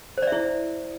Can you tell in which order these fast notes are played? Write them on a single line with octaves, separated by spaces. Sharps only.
C5 D5 E5 E4